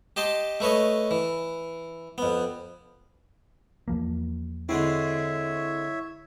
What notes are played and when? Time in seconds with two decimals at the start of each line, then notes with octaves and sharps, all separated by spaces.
0.16 G4 D#5 A5 C6
0.60 A3 B4 C#5 D#5
1.11 E3
2.18 F2 B3
3.88 E2 F3 A#3
4.69 D3 G#3 C4 E4 C#5 E5